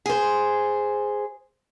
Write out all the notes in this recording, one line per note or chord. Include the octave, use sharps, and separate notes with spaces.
G#4 C5